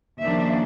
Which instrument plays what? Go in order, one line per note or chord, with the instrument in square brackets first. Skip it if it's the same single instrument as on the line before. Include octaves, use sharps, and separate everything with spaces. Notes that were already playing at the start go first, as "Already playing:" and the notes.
[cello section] D#2 C#3 F3 A#3 D4 E5